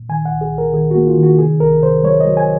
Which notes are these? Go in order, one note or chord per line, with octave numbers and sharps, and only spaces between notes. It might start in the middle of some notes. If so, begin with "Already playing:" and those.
Already playing: A#2
D#3 G#5
C2 F#5
G#4
C2
A#4
D#3 G#4
A#3 F#4
F4
D#3
F#4
C3 G#4
C2 A#4
C3 C5
F#3 C#5
F#3 D#5
G#5